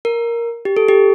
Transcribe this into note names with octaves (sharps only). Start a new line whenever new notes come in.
A#4
G4
A4
G4